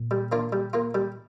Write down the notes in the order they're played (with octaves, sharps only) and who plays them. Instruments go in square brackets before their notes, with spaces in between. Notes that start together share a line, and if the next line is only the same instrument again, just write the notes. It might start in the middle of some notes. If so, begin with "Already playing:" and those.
Already playing: [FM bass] A#2
[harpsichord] G3
A#3 D4 F4
G3
A#3 F4
G3